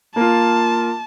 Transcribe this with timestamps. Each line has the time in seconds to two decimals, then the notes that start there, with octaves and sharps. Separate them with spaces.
0.16 A#3 F4 A5